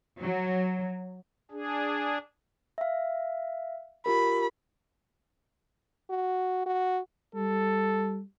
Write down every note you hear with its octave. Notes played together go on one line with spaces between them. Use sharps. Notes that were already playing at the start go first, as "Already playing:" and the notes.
F#3
D4 G#4
E5 F5
F4 G4 A#4 B5
F#4
F#4
G3 A4